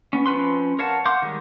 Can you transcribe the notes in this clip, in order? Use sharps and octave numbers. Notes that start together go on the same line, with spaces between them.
B3 C#4
F3 C4 C#4 B4 C6
A#4 C#5 F5 F#5 A5
F5 F#5 C6 D6 G6
D#3 G3 G#3